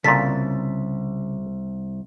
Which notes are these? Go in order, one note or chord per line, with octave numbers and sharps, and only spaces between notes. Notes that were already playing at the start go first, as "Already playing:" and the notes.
C2 A#2 C#3 A4 A6 B6